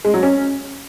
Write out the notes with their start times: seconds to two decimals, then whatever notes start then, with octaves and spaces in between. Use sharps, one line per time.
0.05 G#3
0.14 F#3
0.23 C#4